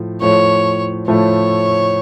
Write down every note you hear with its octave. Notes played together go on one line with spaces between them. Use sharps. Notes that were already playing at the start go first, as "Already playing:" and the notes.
Already playing: A2 F3
A2 F3 A3 C#5
A2 F3 A3 C#5